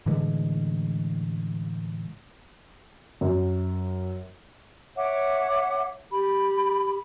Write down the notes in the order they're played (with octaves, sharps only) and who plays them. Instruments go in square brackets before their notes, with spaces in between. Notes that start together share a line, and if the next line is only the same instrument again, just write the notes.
[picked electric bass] A2 D3 E3 G#3
[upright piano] F#2
[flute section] C#5 E5 F#5 D6
G4 B5